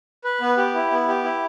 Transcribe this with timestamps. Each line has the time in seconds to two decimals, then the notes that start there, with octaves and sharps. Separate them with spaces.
0.24 B4
0.41 B3
0.57 G4
0.74 E4
0.91 B3
1.08 G4
1.24 E4